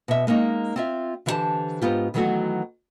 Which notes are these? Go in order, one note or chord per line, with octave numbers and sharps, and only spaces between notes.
B2 E5
G#3 A#3 C#4 D#4
C4 F4 E5
D3 E3 E4 G4 C5 A5
G#2 B3 F4 G4
D#3 E3 F#3 A3 B3 F#4